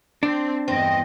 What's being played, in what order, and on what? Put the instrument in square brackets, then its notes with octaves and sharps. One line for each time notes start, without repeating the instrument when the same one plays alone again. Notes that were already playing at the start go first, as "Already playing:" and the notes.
[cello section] C4 [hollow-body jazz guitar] D4
[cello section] E2 G2 D#5 [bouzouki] C4